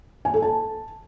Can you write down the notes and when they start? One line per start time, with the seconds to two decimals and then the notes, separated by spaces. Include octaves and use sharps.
0.25 G#5
0.34 A4
0.42 A5